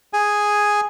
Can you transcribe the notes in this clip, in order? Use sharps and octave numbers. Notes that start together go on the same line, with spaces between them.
G#4 G#5